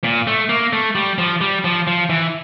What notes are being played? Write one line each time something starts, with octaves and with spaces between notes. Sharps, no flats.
A#2
A3
A#3
A3
G3
F3
G3
F3
F3
E3